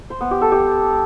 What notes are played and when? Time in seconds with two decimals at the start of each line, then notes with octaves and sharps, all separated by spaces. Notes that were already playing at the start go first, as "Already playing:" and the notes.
0.10 C5
0.21 B3
0.31 G4
0.41 A4
0.52 G4